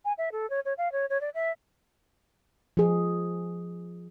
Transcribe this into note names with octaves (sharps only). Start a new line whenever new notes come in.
G#5
E5
A4
C#5
C#5
F5
C#5
C#5
D5
E5
F3 G#4